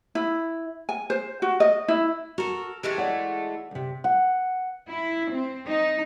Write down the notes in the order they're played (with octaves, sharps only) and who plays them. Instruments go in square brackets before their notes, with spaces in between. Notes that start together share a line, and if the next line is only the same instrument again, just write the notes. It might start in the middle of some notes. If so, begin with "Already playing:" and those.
[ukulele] E4
G#5
C5
F#4
D#5
E4
[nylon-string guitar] F#4 [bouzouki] A4 A#4
[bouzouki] E3 G#3 A3 [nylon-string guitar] G4
[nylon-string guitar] D5 F#5
D2 C3
[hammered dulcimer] F#5
[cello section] E4
C4
D#4